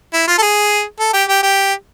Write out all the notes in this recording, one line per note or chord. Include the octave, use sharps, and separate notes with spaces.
E4
F4
A4
G#4
A4
G4
G4
G4